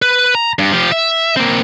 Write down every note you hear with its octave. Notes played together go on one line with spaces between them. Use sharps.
B4
A#5
G2
F3 G4
E5
A#3 C4